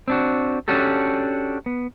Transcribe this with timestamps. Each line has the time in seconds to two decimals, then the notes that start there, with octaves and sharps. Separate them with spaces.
0.08 C4 D4 F#4
0.68 C#4 D4 F#4 G4 A4
1.66 B3